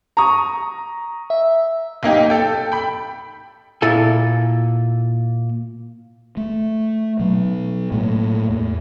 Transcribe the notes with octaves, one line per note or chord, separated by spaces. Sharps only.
A#5 C#6 D#6
E5
B1 A#3 D#4 G4
A4 G5
G5 B5
A#2 E4 A4 G#5
A3
B2 F#3
A2 A3 A#3
E2